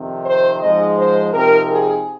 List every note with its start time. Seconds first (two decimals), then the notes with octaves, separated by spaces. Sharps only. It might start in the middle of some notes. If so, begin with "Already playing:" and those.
Already playing: F2 C3 D#3
0.25 C5
0.60 G#2 F3 G#3 D#4 D#5
0.96 C5
1.32 C3 F3 C4 D#4 A#4
1.68 G#4